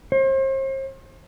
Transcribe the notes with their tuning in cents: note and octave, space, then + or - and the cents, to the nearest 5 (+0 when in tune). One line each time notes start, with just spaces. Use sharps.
C5 +40